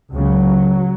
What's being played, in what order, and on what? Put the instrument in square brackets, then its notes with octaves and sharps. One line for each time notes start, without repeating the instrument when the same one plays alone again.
[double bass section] C#2 C#3 F#3